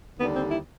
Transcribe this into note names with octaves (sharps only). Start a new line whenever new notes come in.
D#2 D3 G3 B3
C4
E4